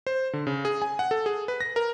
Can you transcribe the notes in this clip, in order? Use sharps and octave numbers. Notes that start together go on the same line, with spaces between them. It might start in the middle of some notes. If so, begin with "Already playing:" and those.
C5
D3
C#3
G#4
G#5
F#5
A4
G#4
B4
A#6
A#4